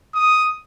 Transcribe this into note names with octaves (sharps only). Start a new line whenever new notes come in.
D#6